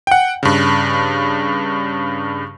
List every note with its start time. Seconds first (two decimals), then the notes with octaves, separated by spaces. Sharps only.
0.07 F#5 G5
0.43 G2 C#3